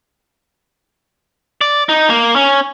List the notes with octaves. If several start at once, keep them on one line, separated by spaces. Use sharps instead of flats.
D5
D#4
A#3
C#4